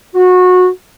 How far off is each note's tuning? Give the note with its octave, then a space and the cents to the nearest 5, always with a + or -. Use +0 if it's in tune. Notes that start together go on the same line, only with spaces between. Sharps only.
F#4 -20